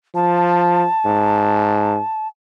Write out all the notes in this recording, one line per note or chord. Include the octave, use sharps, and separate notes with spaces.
F3 A5
G#2